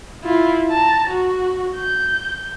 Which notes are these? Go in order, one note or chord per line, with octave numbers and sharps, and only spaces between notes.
E4 F4
A5 A#5
F#4
G6